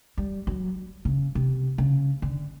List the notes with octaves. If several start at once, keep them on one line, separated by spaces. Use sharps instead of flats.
G3
F#3
C#3
C3
C#3
D3